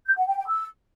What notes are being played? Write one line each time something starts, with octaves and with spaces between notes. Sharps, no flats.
G6
F#5
G5
G5
E6